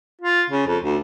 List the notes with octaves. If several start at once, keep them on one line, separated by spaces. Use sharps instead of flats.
F4
C#3
F2
D2